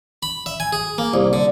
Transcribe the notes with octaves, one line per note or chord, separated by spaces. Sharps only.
B5
E5
G#5
G#4
A#3
C2
D3